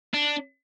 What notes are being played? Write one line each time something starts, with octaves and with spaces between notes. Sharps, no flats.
D4